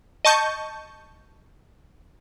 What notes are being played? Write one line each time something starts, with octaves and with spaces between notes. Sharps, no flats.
D#5 A5 C#6 G6